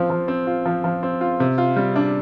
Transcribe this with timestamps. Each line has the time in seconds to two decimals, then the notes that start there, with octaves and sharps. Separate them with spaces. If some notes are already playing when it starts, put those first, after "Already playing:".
Already playing: F3 C4 F4
0.10 F3
0.28 C4
0.47 F4
0.66 F3
0.84 F3
1.03 C4
1.21 F4
1.40 C3
1.58 F4
1.76 G3
1.96 D4